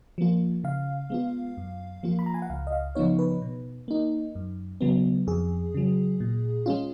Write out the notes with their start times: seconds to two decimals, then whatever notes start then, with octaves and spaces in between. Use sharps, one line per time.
0.18 F3 A#3 F4
0.64 C#3 F5
1.10 G#3 B3 F4
1.57 F#2
2.03 F3 A#3 F4
2.19 B5
2.26 A#5
2.34 G#5
2.42 F#5
2.50 C#2 F5
2.67 D#5
2.72 F5
2.95 C#3 F3 B3 D#4 C#5
3.19 B4
3.42 B2
3.88 A#3 D#4
4.35 F#2
4.81 C#3 F#3 B3
5.27 F2 G#4
5.74 C#3 F#3
6.20 A#2
6.66 G#3 C#4 F4